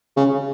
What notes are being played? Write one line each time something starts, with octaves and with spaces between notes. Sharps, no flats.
C#3